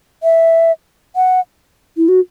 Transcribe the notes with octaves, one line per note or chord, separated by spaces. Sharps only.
E5
F#5
E4
F#4